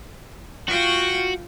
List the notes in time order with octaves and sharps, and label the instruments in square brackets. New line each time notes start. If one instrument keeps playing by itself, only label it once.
[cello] F4 G5 [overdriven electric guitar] F#4